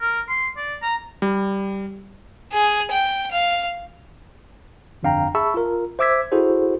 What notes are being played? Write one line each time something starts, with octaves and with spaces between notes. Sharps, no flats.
A#4
C6
D5
A#5
G3
G#4
G5
F5
G1 F2 D4 F5 G5 A#5
G#4 E5 A5 B5 C#6 E6
F4 A#4
C5 E5 D6 E6 G#6 B6
E4 F#4 G#4 A4 C5